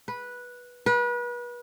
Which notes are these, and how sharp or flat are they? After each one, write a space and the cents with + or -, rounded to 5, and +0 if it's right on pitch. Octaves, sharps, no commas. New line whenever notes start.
B4 -10
B4 -35